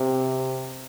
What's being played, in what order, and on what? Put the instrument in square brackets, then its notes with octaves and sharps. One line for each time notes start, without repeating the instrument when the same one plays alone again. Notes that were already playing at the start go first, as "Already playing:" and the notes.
Already playing: [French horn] C3